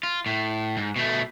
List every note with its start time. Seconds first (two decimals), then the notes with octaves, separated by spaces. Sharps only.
0.03 F4
0.26 A2
0.77 G#2
0.96 B2 A3